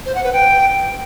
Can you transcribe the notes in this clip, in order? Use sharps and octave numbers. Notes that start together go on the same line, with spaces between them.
C5
F#5
B4
G5